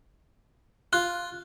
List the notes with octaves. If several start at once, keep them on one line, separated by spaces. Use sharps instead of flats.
F4 F#6